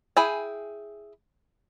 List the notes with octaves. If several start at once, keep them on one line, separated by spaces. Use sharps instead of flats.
E4 G#4 G5 G#5